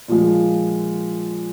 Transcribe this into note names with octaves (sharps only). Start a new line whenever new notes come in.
A#2 F3 G#3